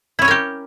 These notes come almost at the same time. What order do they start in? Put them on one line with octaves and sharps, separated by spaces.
E4 C#4 C#5 A#4 G4